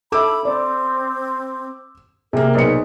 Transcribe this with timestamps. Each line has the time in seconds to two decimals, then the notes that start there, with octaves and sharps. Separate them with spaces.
0.12 A4 E5 B5 D6 E6
0.45 C4 D5
2.33 C3 A#3 G#4 A#4
2.55 B1 G#4 B4 C5 D5 C#7